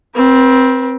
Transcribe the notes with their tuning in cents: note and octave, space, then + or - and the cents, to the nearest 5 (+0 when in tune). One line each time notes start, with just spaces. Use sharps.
C4 +0 B4 -40